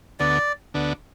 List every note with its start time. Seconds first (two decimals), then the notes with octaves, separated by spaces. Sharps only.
0.20 D2 D3 B3 D5
0.74 D2 D3 B3 D4